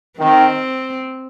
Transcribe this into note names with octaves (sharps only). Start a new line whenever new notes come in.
D#3 C4